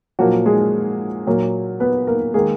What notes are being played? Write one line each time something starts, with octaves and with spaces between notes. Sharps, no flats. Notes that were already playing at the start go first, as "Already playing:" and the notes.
A#2 F3 F#3 A#3 F#4
G#3 G#4
A#2 F#3 A#3
B3 B4
A#3 A#4
D#3 G#3 A#3 G#4